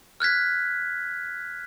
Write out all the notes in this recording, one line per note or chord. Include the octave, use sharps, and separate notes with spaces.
F6 F#6 G#6 B6